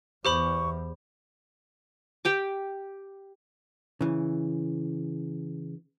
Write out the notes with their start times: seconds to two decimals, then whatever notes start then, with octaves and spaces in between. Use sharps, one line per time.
0.25 E2 G4 C5 B5 C#6
2.25 G4 G5 D6
4.01 C#3 E3